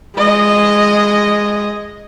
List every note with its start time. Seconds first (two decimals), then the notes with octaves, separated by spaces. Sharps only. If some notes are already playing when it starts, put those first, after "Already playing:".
0.16 G#3 D#5